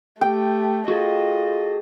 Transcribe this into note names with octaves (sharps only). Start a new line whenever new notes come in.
A3 G4 G5
F4 F#4 G#4 A4 D#5